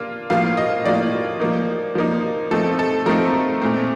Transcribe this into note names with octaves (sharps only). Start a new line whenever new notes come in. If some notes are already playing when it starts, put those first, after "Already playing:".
Already playing: A#3 D4 F4
A2 F3 A#3 F4 F5
D#5
A2 F3 A#3 F4 D5
F3 A#3 D#4
F3 A#3 D#4
F3 A3 C4 D#4 A4
A4
F3 A3 C4 D#4 A#4
A#2 A3 C4